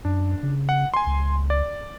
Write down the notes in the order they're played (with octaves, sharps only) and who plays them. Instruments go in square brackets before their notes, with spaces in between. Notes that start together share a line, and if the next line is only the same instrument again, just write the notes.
[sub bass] F#2 [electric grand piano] D4
[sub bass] C#3
[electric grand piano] F#5
G#5 C6
[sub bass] C#2
[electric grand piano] D5